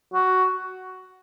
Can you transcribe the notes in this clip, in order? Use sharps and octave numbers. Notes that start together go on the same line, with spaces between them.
F#4